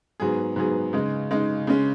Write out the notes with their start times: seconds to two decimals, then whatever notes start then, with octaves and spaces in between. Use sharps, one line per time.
0.20 G#2 F#3 B3 G#4
0.56 G#2 F#3 B3 G#4
0.93 C#3 G#3 D#4
1.31 C#3 G#3 D#4
1.67 C#3 G#3 C#4